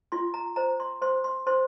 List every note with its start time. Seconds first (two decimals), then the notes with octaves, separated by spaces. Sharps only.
0.12 F4 C6
0.34 A#5
0.56 C5 A#5
0.80 C6
1.02 C5 C6
1.24 C6
1.47 C5 C6